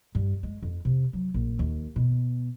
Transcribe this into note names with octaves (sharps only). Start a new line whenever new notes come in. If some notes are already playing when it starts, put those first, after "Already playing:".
G2
G#3
F2
C3
F#3
A#1
D#2
B2